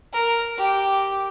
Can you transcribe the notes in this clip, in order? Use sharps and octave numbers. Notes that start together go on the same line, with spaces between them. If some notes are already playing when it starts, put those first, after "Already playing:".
A#4
G4